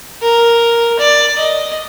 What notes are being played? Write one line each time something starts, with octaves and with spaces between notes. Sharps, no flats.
A#4
D5
D#5